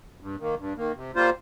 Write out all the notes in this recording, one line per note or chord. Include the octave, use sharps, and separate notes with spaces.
G2
D#3 A#3
G2
D#3 A#3
C3
G3 A#3 F4 C5